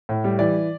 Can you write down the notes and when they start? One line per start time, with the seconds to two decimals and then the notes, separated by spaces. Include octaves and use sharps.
0.09 A2
0.24 G3
0.39 E3 D5